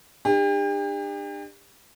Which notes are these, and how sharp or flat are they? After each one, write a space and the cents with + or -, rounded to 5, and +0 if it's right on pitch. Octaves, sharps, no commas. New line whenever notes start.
D4 +40 G4 +40